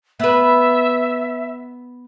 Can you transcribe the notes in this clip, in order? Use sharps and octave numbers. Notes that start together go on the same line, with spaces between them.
B3 B4 E5